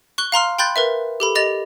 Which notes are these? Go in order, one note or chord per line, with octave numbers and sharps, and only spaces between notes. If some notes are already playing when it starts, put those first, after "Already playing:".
C#6 F#6 G7
F5 A#5 C6 F6
G5 B5 C6 F#6 G6 A6
A#4 B4 E5
G4 A4 B5
G4 D#5 A6 F7